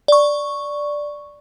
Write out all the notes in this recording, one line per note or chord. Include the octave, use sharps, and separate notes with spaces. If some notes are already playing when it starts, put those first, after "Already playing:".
D5 C#6